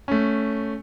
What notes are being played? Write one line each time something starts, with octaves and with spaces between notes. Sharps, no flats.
A3 C#4